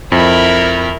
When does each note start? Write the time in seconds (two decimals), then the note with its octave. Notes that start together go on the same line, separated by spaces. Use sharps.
0.12 F2 E4 A#4